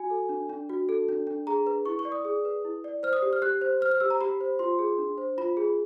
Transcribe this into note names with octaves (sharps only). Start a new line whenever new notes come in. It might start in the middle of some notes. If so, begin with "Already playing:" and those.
Already playing: F#4 G#5
A4
D4
D4
F#4
A4
D4
D4
G#4 A#5
B4
E4 C#6
C#6
D5
D#6
G#4
B4
E4
D5
C5 F6
D#6
G4
F6
G4 F#6
C5
C5 F6
F6
G4 E6
A#5
G4 B5
C5
F4 C6
G#4
D4
C5
F4 B5
G#4